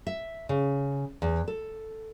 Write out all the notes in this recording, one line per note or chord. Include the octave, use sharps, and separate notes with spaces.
E5
C#3
E2
A4